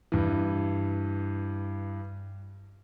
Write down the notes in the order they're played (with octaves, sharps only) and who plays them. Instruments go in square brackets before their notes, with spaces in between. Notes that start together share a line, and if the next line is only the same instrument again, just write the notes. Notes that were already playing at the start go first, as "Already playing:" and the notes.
[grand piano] G2 E3